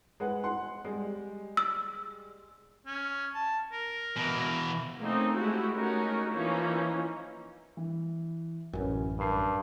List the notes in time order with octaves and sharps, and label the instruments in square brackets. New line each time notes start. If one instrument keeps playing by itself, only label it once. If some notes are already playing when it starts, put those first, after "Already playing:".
[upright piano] G#3 B4 F#5
F#5 C6
G3 G#3
[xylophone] E6
[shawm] C#4
A5
A#4
[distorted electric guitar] B2 E3
[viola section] A3 A#3 C4 C#4 D#4
G#3 A3 E4 F#4 G4
A3 C#4 D#4 F#4 A#4
E3 F3 A#3 C#4 D#4 E4
[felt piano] E3
[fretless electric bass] A1 F#2 [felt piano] C#4 B4 G#5
[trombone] G2 [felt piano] A#4 C7